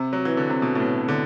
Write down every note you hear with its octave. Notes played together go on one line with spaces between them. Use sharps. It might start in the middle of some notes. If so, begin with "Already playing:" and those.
Already playing: C3
F#3
E3
D3
C3
B2
A2
B2
D3